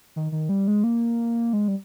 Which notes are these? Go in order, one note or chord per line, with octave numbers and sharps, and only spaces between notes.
D#3
D#3
G3
G#3
A#3
G#3
G3